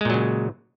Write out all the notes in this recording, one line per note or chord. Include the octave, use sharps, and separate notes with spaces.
A#2 C#3 F#3 G#3